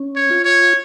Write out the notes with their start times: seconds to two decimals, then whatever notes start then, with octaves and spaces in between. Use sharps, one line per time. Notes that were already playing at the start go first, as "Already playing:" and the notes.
Already playing: C#4
0.16 C#5
0.30 F4
0.45 C#5